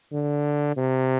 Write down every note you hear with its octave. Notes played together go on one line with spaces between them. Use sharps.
D3
C3